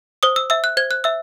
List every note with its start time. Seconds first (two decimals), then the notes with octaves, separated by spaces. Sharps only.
0.23 C5 D#6
0.36 E6
0.50 E5 E6
0.64 F#6
0.77 C5 G#6
0.91 F#6
1.04 E5 E6